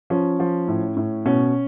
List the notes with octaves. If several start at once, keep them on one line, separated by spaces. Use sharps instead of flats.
F3 C#4
F3
A2
A2
B2 C#4